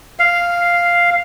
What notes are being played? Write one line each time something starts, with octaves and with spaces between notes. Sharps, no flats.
F5